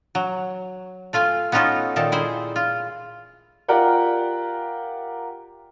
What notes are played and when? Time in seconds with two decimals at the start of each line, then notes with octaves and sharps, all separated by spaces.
0.15 F#3
1.13 A3 F4 F5 G#5
1.52 B3 C#4 D#4 F4 F#4 A4
1.96 A#2 D#3 D#4 A4
2.12 E4 G#4 C5
2.56 F4
3.68 F4 G4 A#4 D5 F#5 G5